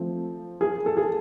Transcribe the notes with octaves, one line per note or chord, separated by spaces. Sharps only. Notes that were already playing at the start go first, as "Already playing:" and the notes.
Already playing: F3 A3 C4
G#4
A4
G#4